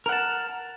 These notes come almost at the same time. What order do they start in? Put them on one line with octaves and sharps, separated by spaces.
A#4 F#5 A5